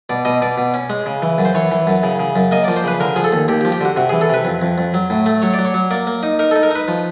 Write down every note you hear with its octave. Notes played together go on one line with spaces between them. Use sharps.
B2 D5
B2 D#5
B2 D5
B2
C#4
G#3
C#3
E3
F#2
C5
E3 C#5
E3
F#2
C#3
C#3
F#2
A#3 D#5
D5
F3
C5
C#3 B4
D3 A#4
F3 G#4
A4
D#2
D#2 G4
G4
F3
G4
D3 F#4
C3 F#4
E3 G#4
A4
C3 B4
F2
F2
F2
F#3
A2
A3
F#3 C#5
F#3 D5
C#5
F#3
A#3 D5
A#3
D#4
D#4 A#4
A4
D#4
A#4
D#4 B4
F3